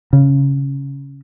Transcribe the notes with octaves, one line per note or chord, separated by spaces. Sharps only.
C#3